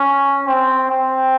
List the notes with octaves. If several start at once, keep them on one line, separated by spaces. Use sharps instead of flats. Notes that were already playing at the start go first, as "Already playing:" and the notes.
Already playing: C#4
C4
C4